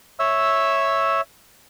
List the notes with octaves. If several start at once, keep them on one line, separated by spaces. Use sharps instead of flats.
C#5 E5 E6